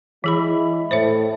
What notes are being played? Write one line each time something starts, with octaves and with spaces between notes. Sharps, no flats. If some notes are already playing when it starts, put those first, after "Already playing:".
E3 G#3 E4 G#4 B5
A2 C5 C#5 E5